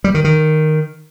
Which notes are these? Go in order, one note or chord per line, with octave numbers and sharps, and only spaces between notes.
G3
D#3
D#3